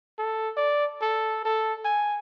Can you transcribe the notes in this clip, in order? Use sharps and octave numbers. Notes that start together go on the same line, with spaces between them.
A4
D5
A4
A4
G#5